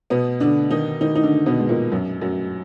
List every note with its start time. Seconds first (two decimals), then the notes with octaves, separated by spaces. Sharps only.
0.10 B2 B3
0.40 D3 D4
0.71 D#3 D#4
1.01 D#3 D#4
1.15 D#4
1.23 D3 D4
1.46 B2 B3
1.60 G#3
1.69 A#2 A#3
1.92 F#2 F#3
2.21 F#2 F#3